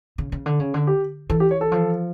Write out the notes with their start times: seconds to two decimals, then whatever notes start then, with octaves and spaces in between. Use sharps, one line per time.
0.18 C#3
0.32 C#3
0.46 D3
0.60 C#3
0.74 D3
0.87 G4
1.30 E3 A4
1.40 G4
1.51 C#5
1.61 A4
1.72 F3